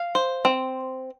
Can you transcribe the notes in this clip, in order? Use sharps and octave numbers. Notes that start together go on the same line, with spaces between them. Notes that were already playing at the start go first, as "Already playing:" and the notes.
Already playing: F5
C5
C4